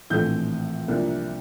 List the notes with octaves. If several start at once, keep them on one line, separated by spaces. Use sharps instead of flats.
A#1 A2 E3 A3 C4 G6
C2 C3 F3 A#3 D4